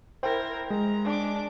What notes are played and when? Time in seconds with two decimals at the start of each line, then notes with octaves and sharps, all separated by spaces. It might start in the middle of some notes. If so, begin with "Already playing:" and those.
0.23 E4 A#4 C5 G5
0.70 G#3 A#5
1.05 D4 D6